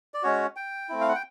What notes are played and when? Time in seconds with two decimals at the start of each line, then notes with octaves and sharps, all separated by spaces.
0.14 D5
0.23 G#3 C#4 F#4 C#5
0.56 G5
0.89 A3 C4 E4
1.01 F5
1.08 F#5
1.15 G5